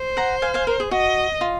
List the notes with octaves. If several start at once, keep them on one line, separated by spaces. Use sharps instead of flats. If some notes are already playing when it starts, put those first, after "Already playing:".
Already playing: C5
F#5 A#5
F5 G#5
F5 G#5
A#4
G#4
F#4 D#5
F4